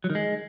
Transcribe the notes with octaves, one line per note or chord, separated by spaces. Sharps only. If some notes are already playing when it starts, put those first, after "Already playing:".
F#3
D#3
G#3